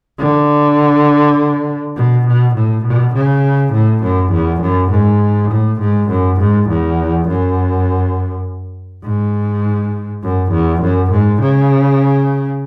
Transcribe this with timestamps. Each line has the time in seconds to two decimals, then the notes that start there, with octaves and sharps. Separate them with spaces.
0.19 D3
1.97 B2
2.26 B2
2.55 A2
2.84 B2
3.14 C#3
3.73 A2
4.03 F#2
4.32 E2
4.62 F#2
4.91 G#2
5.51 A2
5.81 G#2
6.09 F#2
6.40 G#2
6.69 E2
7.28 F#2
9.04 G#2
10.23 F#2
10.52 E2
10.82 F#2
11.12 G#2
11.41 C#3